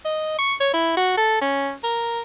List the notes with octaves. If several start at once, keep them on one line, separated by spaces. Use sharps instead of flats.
D#5
C#6
C#5
E4
F#4
A4
C#4
A#4